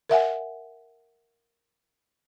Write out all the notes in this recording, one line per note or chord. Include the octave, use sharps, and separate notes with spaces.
A#4 E5 F#5 G#5